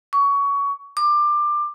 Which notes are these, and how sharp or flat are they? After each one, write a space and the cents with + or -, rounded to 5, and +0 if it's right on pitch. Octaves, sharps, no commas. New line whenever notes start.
C#6 +20
D6 +20